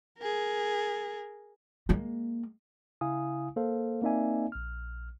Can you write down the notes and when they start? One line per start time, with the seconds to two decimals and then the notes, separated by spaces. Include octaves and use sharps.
0.18 G#4 A#4
1.89 G#3 A#3
3.01 C#3 E4 F5 G#5 D#6
3.56 A#3 A4 C5 F5
4.02 A#3 C4 D#4 D5 E5 G#5
4.52 A#1 F6